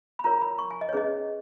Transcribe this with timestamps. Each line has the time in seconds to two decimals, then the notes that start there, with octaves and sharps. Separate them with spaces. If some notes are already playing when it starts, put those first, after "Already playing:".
0.19 B5
0.24 F4 A#4 C#5 A#5
0.42 B5
0.59 C#6
0.71 G#5
0.81 D#5
0.89 C#5
0.93 C#4 G#4 B4 D#5